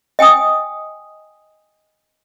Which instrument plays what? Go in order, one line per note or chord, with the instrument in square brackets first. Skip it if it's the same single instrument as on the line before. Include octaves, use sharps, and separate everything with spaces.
[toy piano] D#5 G5 G#5 D#6